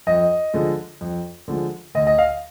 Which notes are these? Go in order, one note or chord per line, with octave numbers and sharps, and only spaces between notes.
F2 D#5
D3 F3 G#3
F2
D3 F3 G#3
D2 D#5
D#5
F5